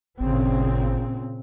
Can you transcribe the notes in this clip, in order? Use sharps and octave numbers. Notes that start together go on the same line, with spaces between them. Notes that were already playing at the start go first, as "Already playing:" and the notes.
G#1 A#2 C#3 C4